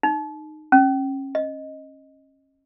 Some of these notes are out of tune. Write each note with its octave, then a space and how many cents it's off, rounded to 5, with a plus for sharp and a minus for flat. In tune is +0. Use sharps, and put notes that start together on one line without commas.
D#4 -20
C#4 -30
D#5 +0